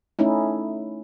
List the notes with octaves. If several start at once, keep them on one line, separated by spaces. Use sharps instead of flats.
A3 C#4 D#4 E4